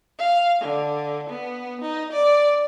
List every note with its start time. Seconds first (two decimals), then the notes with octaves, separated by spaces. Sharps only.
0.18 F5
0.61 D3
1.29 B3
1.81 D#4
2.12 D5